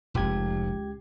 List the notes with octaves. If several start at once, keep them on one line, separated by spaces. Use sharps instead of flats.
F1 C#2 G4 G#6